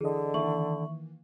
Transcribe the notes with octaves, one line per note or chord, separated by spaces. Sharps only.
D3 E3 G#4 D#5
D#3 E3 A#3 E5 C#6 F#7